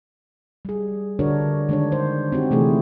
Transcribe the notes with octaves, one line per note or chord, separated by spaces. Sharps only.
G3 G#4
D3 D4 F#4 A#4 C#5
D#3 G#3 D4 D#4 C#5
C5
C4 D#4 F#4 G4
C3 E3 A3 E4 G#4